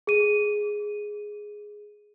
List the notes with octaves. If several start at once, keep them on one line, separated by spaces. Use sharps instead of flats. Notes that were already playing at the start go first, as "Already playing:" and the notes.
G#4 D#7